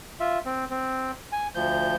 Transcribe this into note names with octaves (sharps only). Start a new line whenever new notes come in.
F4 E5
C4
C4
G#5
D2 F3 G6